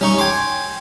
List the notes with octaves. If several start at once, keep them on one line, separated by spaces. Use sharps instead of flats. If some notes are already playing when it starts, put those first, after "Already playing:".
G3 C#4 D#4 C#6
G5 G#5 C6 D6